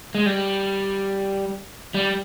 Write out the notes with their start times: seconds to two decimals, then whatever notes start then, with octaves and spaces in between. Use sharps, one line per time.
0.15 G#3
0.26 G3
1.94 G3